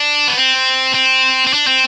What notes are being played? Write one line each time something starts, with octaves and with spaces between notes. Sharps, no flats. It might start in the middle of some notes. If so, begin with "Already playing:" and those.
Already playing: D4
B3
C4
C4
C4
D4
C4